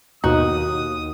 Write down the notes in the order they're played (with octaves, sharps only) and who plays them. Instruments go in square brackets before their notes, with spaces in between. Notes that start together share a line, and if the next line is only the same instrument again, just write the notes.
[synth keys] D#2 [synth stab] B2 D#4 [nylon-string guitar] F#4 [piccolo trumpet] D#6